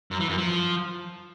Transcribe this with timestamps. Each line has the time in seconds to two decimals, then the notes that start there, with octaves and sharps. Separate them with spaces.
0.11 F#2
0.20 E3
0.29 F#2
0.38 F3